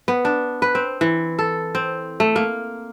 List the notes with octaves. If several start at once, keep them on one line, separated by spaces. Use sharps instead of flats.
B3
D4
B4
C4
E3
A4
C4
A3
A#3